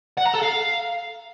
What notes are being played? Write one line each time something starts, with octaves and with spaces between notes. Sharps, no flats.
F#5
A#5
A4
F5